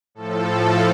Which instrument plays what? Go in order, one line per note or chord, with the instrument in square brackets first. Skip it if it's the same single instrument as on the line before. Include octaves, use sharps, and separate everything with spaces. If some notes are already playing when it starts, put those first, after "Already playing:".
[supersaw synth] A2 F3 A4